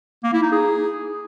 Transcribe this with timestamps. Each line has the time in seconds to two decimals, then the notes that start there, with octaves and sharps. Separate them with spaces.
0.24 A#3
0.33 E4
0.43 D#4
0.52 G#4